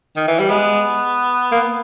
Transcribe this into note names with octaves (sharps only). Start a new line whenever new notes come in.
D#3
E3
G3
G#3 B3
A#3